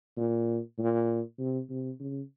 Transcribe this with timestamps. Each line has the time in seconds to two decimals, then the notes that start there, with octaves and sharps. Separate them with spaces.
0.17 A#2
0.79 A#2
1.39 C3
1.70 C3
2.00 C#3